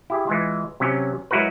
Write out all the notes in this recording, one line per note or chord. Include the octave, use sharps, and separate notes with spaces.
E4 G4 G#4
E3 G#3 F4
C3 F#3 C#4
F#3 G#3 E4 F#4 A#4 B4